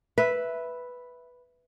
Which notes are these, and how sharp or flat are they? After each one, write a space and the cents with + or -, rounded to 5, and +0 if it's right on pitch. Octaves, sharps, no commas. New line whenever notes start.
B4 +0 E5 +0